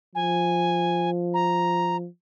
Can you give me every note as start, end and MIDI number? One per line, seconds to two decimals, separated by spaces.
0.15 2.07 53
0.15 1.10 80
1.34 1.96 82